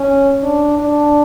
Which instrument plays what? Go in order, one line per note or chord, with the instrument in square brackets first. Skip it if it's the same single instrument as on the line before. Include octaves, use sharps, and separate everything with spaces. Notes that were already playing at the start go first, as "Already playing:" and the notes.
Already playing: [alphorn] C#4
D4
D4